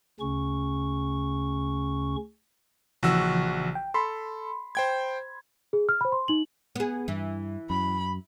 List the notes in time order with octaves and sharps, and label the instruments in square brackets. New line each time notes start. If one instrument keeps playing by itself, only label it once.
[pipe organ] D2 C#3 C#4 C#6
[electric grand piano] A#1 F#4 E6 [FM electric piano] C#3 E3 F3
[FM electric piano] G5
[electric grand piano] A4 [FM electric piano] B5 C6
[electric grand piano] C5 G5 G#6
[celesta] G#4
F6
C5 B5
C6
D#4 F#7
[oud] B3 G#4
[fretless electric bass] G2 [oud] E3
[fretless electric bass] F#2 [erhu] B5